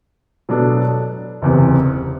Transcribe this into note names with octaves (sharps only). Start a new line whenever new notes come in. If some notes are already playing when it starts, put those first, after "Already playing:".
B2 F#3 B3 D4 A4
F#1 E2 C3